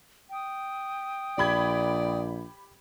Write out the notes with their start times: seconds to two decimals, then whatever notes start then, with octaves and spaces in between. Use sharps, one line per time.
0.31 G5 D#6
1.38 A#1 G4 D5 B5 G#6